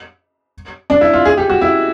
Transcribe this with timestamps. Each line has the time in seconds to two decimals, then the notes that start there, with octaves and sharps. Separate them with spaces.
0.90 D4
1.01 E4
1.13 F4
1.25 G#4
1.37 G4
1.50 F#4
1.61 E4